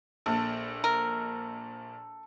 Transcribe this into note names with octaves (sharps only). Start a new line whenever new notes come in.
A#1 A#2 A4
A#4